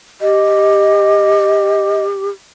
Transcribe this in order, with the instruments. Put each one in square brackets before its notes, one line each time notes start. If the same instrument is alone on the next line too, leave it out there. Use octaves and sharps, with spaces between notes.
[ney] G4 [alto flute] D#5